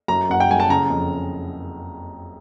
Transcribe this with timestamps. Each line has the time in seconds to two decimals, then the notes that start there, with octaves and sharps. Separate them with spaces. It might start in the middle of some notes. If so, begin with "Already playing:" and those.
0.08 F#2 A#5
0.29 F#1 F#5
0.40 G5
0.49 G3 G#5
0.60 A5
0.70 C#3 A#5
0.90 F2